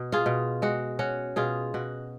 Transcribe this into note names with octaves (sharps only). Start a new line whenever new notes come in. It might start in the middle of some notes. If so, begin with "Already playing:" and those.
Already playing: B2
F4 G#4
B2
G#3 F#4
C#4 F#4
B2 F4 G#4
B2 F#4